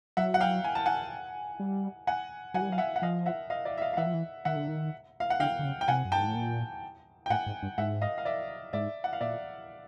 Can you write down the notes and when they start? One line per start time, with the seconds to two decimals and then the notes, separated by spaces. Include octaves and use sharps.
0.17 F#3 E5 F#5
0.34 F#5
0.40 F5 G5
0.64 G#5
0.75 A5
0.86 F#5 G#5
1.60 G3
2.07 F#5 G#5
2.54 F#3 F#5 G#5
2.62 G3
2.70 F#3 F5
2.78 E5 F#5
2.96 F#5
3.02 F3 D#5 F5
3.26 E5 F#5
3.50 D#5 F5
3.65 D5 E5
3.77 E5
3.82 D#5 F5
3.93 F5
3.97 E3 E5 F#5
4.06 F3
4.14 E3
4.45 D#3 E5 F#5
4.56 D3
4.68 D#3
5.20 F5
5.30 F#5
5.40 D3 F5 G5
5.59 D3
5.65 C#3
5.81 G5
5.88 C3 F#5 G#5
6.05 F#2
6.12 G2 G5 A5
6.20 G#2
6.27 A2
6.35 A#2
7.26 G5
7.30 A2 F#5 G#5
7.46 G#2
7.63 G2
7.78 G#2 E5 F#5
8.02 D#5 F5
8.18 F5
8.25 D5 E5
8.73 G#2 D5 E5
9.04 F#5
9.13 F5
9.21 A#2 D5 E5